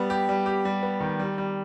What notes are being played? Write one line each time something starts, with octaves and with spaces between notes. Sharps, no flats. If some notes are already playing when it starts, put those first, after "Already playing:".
Already playing: G3 B3
G4
G3
G4
G3
B3
D#3
G3
G3